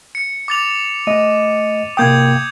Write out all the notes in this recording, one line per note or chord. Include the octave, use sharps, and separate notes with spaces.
C#7
D6 A6 F7
A3 D#5 D#7
C3 A#3 G5 D#6 G6 G#6